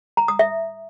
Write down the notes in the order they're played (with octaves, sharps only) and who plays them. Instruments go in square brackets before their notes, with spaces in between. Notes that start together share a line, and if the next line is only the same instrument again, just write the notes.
[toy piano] A#5
D#6
E5